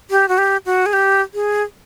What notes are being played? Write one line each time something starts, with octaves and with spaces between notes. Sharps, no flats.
G4
F#4
G4
F#4
G#4
G4
G#4